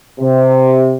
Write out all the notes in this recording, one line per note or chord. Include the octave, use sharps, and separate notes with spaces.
C3